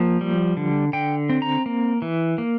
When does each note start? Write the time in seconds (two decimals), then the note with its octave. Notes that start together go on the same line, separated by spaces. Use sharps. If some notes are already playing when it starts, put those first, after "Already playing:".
Already playing: F3 A#3 G5
0.21 G3
0.57 D3
0.93 D3 G5
1.29 C4
1.42 A#5
1.66 A#3
2.02 E3
2.38 A#3